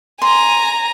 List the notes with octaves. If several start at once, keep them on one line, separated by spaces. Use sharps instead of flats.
G#5 A#5 C6